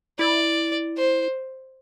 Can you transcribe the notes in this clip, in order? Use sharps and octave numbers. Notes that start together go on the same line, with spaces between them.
E4 D5
C5